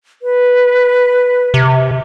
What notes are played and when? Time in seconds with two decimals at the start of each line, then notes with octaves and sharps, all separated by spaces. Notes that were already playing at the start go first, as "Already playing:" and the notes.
0.22 B4
1.54 C3